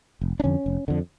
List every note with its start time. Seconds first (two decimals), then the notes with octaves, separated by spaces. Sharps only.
0.21 F1
0.40 D4
0.44 F2 D3 C#4
0.66 F1
0.88 F2 D3